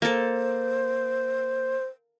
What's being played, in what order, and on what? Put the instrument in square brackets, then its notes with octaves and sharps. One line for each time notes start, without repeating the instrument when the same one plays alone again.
[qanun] A#3 A4 [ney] C5